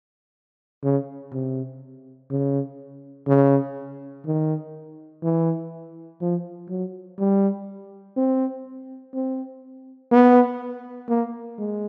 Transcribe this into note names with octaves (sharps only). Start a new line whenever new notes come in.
C#3
C3
C#3
C#3
D#3
E3
F3
F#3
G3
C4
C4
B3
A#3
G#3